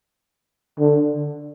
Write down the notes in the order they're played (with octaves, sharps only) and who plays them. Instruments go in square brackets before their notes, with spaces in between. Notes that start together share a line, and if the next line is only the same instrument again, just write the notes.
[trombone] D3